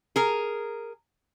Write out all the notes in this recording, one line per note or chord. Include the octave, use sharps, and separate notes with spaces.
G#4 A#4